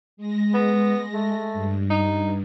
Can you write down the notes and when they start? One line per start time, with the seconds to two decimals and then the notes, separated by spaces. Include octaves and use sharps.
0.17 G#3 A#6
0.54 B3
1.14 A3
1.53 G2
1.90 D#4